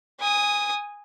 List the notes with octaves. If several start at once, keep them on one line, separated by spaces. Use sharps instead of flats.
G#5 D#6